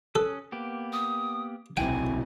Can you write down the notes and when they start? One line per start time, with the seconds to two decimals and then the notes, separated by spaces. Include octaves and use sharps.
0.15 C#4 A4 D#6 F#6
0.52 A#3 B3 G4
0.93 D#6
1.77 D1 B1 C3 E4 G5 G#5